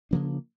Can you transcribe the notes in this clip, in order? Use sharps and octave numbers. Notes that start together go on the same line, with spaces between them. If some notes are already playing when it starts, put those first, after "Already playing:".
C#3 F3 A#3 D4